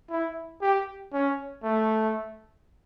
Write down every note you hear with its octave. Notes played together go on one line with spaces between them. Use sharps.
E4
G4
C#4
A3